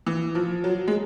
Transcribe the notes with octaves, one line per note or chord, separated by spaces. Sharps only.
E3
F3
F#3
G#3